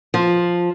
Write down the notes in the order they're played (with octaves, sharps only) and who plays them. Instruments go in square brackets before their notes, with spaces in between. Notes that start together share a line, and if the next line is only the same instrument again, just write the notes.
[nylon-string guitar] F3